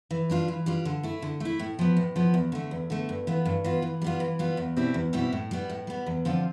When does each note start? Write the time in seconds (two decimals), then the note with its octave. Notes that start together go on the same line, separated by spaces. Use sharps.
0.11 E3
0.30 G3 D4 F4
0.48 E3
0.66 G3 D4 F4
0.85 D3
1.03 A3 E4
1.22 D3
1.40 A3 E4
1.59 A2
1.79 F3 B3
1.97 A2
2.16 F3 B3
2.34 E2
2.52 D3 A3
2.71 E2
2.90 D3 A3
3.09 G2
3.27 E3 B3 F4
3.45 G2
3.64 E3 B3 F4
3.82 E3
4.02 G3 B3 F4
4.20 E3
4.39 G3 B3 F4
4.57 E2
4.76 B2 G3 C4 E4
4.94 E2
5.13 B2 G3 C4 E4
5.33 A2
5.51 G3 B3
5.70 A2
5.87 G3 B3
6.06 E2
6.25 D3 F3 C4 F4